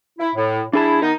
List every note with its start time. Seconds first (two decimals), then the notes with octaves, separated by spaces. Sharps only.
0.19 E4
0.35 A2
0.73 D4 E4 G#4 A5
1.02 D#3 B3 D#4